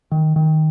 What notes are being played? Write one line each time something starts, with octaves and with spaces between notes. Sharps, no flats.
D#3
D#3